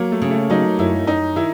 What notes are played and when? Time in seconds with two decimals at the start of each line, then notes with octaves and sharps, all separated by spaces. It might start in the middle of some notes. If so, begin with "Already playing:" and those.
Already playing: F#3 A#3
0.12 A3
0.22 C#3
0.31 A3
0.50 F#3 D#4
0.79 F#2 E4
1.07 F#2 D#4
1.36 D#3 E4